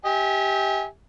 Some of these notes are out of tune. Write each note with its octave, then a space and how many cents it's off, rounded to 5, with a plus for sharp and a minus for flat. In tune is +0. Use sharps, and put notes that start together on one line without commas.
G4 +0 E5 -40 G#5 +0